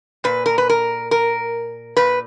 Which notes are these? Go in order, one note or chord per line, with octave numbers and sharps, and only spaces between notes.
A#2 B4
A#4
B4
A#4
A#4
A#2 B4